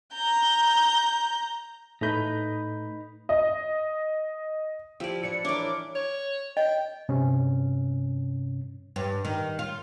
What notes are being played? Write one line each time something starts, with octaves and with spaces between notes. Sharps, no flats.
A#5 G6
A2 A3 D#4 B4 G6
D#5
F3 E4 G4 D5
E3 G3 D4 C#7
E3 D4 E4 A#4 C#5 D6
C#5
D#5 G5
G2 C3 C#4
G2
D#3
F4